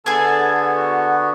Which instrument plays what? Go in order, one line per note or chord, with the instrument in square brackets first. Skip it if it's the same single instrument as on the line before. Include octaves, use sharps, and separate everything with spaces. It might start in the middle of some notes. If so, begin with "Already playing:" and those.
[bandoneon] D3 B3 [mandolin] G#4 G#5 [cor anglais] A4
[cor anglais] F#4
F#4